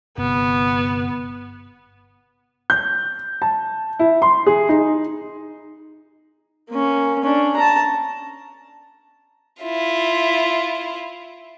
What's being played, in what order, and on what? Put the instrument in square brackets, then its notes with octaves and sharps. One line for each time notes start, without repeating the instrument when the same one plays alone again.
[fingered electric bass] G1 C3 [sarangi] B3
[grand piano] G6
A5
E4
C6
G#4
D#4
[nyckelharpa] A#3 C#4
C#4 D4
A5 A#5
[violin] E4 F4